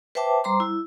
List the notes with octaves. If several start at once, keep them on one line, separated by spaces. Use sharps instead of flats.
B4 C5 E5 G5 A5 D6
G3 C5 A#5 C6 D6
E4